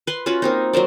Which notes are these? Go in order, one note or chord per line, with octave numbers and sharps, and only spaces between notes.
B4 C6
C#4 F4 F#4 B4
A#3 C4 D#4
F#3 A#4 C5 D5